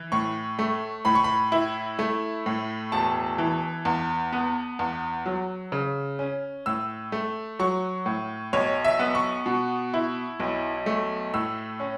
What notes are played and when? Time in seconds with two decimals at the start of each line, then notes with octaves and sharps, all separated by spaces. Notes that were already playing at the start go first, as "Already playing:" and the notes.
Already playing: E3
0.12 A2 C#6
0.59 A3
1.05 A2 B5
1.15 C#6
1.24 B5
1.52 E4
1.99 A3
2.46 A2
2.92 E1 A5
3.38 E3
3.85 E2
4.33 B3
4.79 E2
5.26 F#3
5.72 C#3
6.19 C#4
6.66 A2 E6
7.12 A3
7.59 F#3 C#6
8.06 A2
8.53 B1 C#5
8.85 E5
8.99 B3
9.15 C#6
9.46 B2
9.94 E4
10.40 B1
10.86 A3
11.34 A2 E6
11.80 C#4